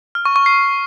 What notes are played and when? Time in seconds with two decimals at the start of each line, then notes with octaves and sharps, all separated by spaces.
0.15 F6
0.25 C#6
0.36 C#6
0.46 C7